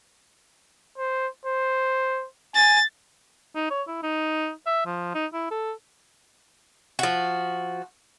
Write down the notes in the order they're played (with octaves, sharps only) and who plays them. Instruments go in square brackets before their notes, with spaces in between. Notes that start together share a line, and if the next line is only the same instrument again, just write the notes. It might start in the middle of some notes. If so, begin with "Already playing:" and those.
[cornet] C5
C5
[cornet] G#5 [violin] A6
[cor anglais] D#4
C#5
E4
D#4
E5
F3
D#4
E4
A4
[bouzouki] F3 F#4